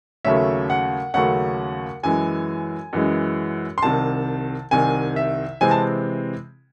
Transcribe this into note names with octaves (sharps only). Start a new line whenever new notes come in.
D#2 C#3 F#3 A3 C#4 E5
F#5
D#2 C#3 F#3 A3 C#4 F#5
F#2 E3 G#3 G#5
F#2 E3 G#3
C6
C2 C3 D#3 A5
C2 C3 D#3 G#5
E5
C3 E3 G#3 C4 G#5
A5